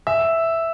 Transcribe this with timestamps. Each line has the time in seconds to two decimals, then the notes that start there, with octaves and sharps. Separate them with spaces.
0.07 E5